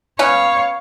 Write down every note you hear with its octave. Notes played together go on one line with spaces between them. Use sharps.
B3 C#4 C#5 F5